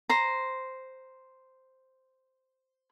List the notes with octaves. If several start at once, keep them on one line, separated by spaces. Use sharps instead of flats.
C5 A#5